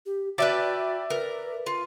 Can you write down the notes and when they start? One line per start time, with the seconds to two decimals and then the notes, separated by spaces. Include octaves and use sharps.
0.06 G4
0.38 F#4 B4 D5 E5 G5 A5
1.10 A#4 B4
1.66 F4